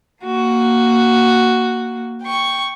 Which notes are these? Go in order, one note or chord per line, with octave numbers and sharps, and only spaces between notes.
A#3 F#4
G5 C#6